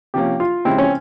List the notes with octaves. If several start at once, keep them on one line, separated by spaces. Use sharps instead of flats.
C3 F3 A#3 C#4 G4
F4
C#3 F3 G#3 C4 E4 G4
C#4